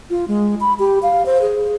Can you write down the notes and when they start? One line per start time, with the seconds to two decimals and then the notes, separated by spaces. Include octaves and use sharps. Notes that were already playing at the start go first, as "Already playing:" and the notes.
0.10 F4
0.28 G#3
0.61 B5
0.79 G4
1.03 F5
1.26 C5
1.41 G#4